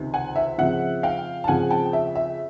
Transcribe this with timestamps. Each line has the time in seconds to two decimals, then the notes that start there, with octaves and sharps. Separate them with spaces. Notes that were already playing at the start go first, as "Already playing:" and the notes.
Already playing: C#2 C3 D#3
0.14 F#5 G#5
0.36 E5
0.58 F2 C#3 F3 E5 F#5
1.03 F5 G5
1.44 A5
1.48 F2 C#3 F3 F#5 G#5
1.70 G5 A5
1.93 E5
2.16 E5